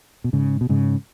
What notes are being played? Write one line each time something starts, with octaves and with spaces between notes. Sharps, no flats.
B2
G#2 C#3
B2
G#2 C#3